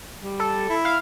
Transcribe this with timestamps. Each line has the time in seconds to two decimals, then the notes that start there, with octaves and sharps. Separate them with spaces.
0.21 G3
0.39 A4
0.69 E4
0.85 F5